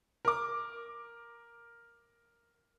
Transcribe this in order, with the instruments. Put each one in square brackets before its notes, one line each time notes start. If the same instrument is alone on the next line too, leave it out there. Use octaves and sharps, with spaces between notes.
[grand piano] A#4 D6